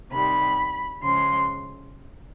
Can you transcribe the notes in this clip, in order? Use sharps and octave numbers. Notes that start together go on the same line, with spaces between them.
C3 D#3 G3 B5
C#3 F3 G#3 C6